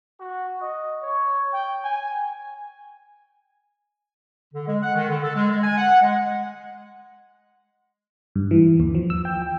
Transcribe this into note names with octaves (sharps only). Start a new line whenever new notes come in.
F#4
D#5
C#5
G5
G#5
D3
G#3
F#5
D#3
D3
A4
G#3
G#3
G#5
F#5
G#3
G2
E3
D#2
F3
E6
G5
G5